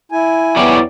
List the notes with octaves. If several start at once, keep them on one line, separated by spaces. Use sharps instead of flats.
E4 G#5
E2 F#3 D5 G5